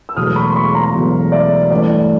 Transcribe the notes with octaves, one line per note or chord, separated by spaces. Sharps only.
E6
E1 E2 B2 F#3 A3 D#6 F6
B5 C#6
C6
B5 C#6
A#5 C6
E1 E2 B2 F#3 A3
D5 E5
A1 G2 E3 A3 D5